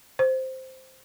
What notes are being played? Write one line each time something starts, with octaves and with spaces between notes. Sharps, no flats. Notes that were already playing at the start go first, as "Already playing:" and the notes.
C5